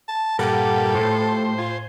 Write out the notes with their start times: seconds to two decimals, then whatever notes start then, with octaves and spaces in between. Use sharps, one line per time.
0.08 A5
0.39 G2 A#2 G3 A4 A#4 D5 F#5 G#5
0.95 A2 A3 F4 G4 C5
1.58 F4 G#5